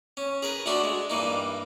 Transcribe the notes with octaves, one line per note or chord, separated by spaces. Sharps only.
C#4
G#4 A#4 B4
D2 D3 A3 F#4 C6 C#6
G#3
G2 E3 A#3 D#4